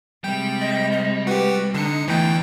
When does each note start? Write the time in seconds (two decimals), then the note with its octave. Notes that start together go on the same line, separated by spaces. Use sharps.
0.24 C3 G3 G#3 G5
0.61 D#5
0.92 D#5
1.27 F#4 G4 B4
1.74 D3 D4 D#4 C#7
2.08 E2 D3 E3 A3 G5